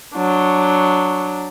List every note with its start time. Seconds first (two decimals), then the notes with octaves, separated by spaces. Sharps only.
0.16 F#3 D4